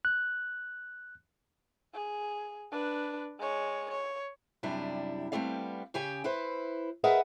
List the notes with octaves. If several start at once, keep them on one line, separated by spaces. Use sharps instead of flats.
F#6
G#4
D4 B4
G#3 C#5
C#5
F#2 C3 G3 D4 E4
G3 A3 B3 C4 D5 F5
C#3 G4 G5 G#5
E4 B4 C5
G#4 A#4 B4 D#5 E5 F#5